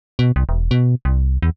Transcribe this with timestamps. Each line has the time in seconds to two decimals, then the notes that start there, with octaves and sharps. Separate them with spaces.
0.19 B2
0.36 C2
0.49 E1
0.71 B2
1.05 C2
1.42 E2